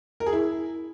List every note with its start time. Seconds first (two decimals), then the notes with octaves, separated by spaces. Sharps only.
0.20 A#4
0.26 G#4
0.33 E4